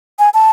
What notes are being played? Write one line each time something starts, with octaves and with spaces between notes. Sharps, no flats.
G#5
A5